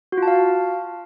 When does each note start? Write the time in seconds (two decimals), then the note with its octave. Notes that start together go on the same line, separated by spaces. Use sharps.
0.12 F#4
0.17 F4
0.23 A5
0.28 F5